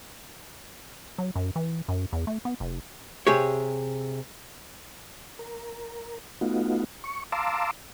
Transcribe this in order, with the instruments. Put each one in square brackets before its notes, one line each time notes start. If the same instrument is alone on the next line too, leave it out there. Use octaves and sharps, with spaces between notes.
[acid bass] F#3
F#2
E3
F#2
E2
A3
B3
F1
[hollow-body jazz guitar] C3 G4 G#4 C#5
[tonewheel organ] A#4
A3 B3 D#4 F4 F#4
C#6
F5 A5 A#5 C6 D6 E6